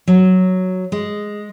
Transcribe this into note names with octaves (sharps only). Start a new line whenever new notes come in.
F#3
G#3